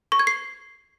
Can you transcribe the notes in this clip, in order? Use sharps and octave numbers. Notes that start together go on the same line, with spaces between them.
C#6
G#6
C7